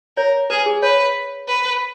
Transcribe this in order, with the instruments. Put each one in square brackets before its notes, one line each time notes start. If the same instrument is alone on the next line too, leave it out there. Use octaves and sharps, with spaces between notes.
[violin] A#4 [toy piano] C#5
[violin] G#4 [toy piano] B4
[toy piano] G#4
[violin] B4 [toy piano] C#5
[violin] B4